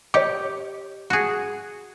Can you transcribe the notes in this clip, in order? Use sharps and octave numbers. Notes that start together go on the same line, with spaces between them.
G4 C#5 D#5 D6
F#4 G#4